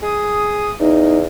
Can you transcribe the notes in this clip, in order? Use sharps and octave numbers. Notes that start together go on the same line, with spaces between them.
G#4 D#6
E2 D#4